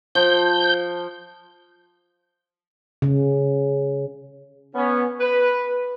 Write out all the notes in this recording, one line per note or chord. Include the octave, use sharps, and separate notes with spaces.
F3 G6
C#3
B3 C#4
B4